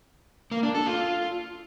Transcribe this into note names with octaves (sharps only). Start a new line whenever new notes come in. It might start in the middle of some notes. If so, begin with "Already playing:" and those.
A#3
D4
A4
F4